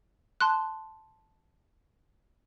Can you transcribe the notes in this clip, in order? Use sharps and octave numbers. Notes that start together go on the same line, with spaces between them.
A5 C6 F#6